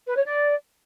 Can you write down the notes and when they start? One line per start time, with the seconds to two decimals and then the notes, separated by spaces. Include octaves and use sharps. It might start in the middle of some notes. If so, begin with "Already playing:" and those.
0.07 B4
0.17 C#5
0.26 D5